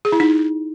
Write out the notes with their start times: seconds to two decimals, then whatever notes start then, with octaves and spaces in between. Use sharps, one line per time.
0.05 G#4
0.12 E4
0.20 D#4